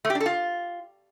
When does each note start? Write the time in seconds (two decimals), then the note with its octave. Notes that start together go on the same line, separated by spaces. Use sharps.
0.05 A3
0.10 G4
0.15 D4
0.20 A4
0.26 F4